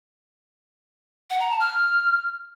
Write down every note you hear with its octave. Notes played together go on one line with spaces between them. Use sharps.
F#5
A#5
A5
F6